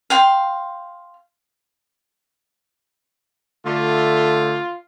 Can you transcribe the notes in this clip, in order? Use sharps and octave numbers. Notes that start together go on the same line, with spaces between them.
F5 G5 C6
D3 A3 F4